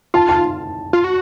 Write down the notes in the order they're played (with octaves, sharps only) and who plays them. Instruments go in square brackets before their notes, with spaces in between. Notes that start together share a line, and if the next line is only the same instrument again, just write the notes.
[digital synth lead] F4 [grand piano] A5
[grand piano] A5
[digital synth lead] F4
F#4